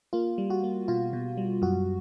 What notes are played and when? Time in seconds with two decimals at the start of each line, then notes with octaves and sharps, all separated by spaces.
0.13 A#3 F4
0.38 G3
0.50 F#4
0.64 A#3
0.88 B2 F4
1.13 B2
1.37 G3
1.62 F#2 F#4